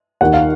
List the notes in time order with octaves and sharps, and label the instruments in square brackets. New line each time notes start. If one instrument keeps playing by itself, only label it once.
[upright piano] D#2 D#3 F#5
F5